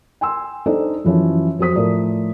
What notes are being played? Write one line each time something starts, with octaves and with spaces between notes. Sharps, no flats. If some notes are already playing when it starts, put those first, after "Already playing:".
G5 G#5 C6 E6
D4 D#4 A4 C5 D5 D#5
F#2 E3 F3 C#4
F2 F#3 C5 D#6 B6
A2 F3 A#4 D5